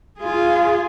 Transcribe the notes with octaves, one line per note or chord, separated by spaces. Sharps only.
F4 G#4